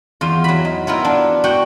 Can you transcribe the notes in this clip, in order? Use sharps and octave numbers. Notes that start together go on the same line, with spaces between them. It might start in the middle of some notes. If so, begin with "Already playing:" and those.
E2 F4
F#3 B5
D#4
B3 E4 F4 A#4
D4
F#4 F#5 G5